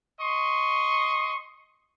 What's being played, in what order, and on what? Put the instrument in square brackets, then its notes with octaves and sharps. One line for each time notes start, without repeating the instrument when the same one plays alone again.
[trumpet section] D#5 C6 C#6